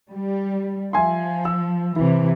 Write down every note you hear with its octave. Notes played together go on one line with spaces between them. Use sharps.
G3
F3 E5 G#5 C6
E6
C3 E3 E4